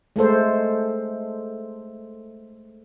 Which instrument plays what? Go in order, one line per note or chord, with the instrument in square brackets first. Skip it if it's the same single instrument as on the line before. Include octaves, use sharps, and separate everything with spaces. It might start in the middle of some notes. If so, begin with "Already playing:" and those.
[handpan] G#3 A3 A4 C5